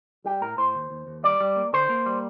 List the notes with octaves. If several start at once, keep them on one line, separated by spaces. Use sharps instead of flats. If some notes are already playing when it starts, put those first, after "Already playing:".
G3 G4
A2 A#4
A2 C5
D#2
D#2
D#2
G3 D5
G3
A#3
D3 C5
A#3
G3